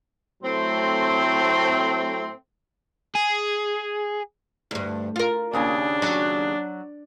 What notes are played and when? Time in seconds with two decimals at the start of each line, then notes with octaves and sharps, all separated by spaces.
0.43 A2 F#3 A3 C4
3.15 G#4
4.71 D2 G2
5.16 F4 A#4
5.53 D#2 C#3 D4 G#5
6.02 F#3